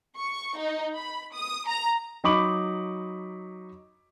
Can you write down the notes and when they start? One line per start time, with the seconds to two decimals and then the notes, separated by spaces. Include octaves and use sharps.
0.18 C#6
0.58 D#4
0.97 B5
1.35 D#6
1.68 A#5
2.24 F#3 D#4 B5 C#6 D6 F#7